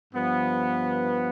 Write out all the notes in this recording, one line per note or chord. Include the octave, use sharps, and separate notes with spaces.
G2 F3 B3